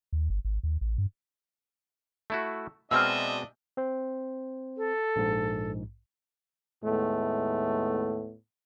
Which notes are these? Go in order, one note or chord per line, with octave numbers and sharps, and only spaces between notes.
D#2
G1
G#1
D#2
A1
G2
A3 E4 F#4
B2 G#3 C4 D4 D#5 E5 E6 F6
C4 C5
A4
A#1 G#2
D#2 A2 G#3 A3 B3